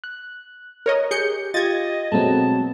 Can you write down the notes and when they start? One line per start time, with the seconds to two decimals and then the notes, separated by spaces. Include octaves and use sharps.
0.04 F#6
0.86 A#4 C#5 D#5
1.11 G4 G#4 G6 C#7
1.54 F4 G4 D#5 G#6 A6
2.12 B2 F#3 G#3 A3 B3 C4 A5